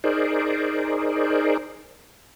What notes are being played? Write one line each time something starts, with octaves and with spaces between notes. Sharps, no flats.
D#4 G#4 A#4 C5 D5